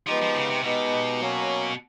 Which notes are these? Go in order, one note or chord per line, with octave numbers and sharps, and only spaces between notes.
F3 G#3 B3 D#4 G4
F3
C#3
C3
B2 G#3 B3 D#4 G4
F#3 A#3 C#4